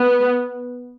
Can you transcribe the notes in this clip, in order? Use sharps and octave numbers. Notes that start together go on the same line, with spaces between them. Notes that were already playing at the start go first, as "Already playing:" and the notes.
Already playing: B3